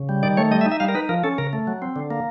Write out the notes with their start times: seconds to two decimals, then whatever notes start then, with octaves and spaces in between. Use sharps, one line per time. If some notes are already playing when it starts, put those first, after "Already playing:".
Already playing: C#3
0.09 G3
0.23 D#3 D5
0.37 A3 C#5
0.51 G3 D#5
0.61 E5
0.66 D#4
0.71 E5
0.80 G3 F5
0.89 A#4
0.95 D#4 B4
1.09 F3 A#4
1.24 C#4 A4
1.38 C#3 A#4
1.53 A3
1.67 F#3
1.82 C4
1.96 D3
2.11 A#3